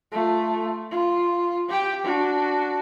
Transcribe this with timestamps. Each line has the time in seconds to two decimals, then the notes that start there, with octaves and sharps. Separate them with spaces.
0.12 A3 F4
0.91 F4
1.70 G4 G5
2.04 D4 F#4